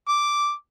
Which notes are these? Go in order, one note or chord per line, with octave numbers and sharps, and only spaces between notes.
D6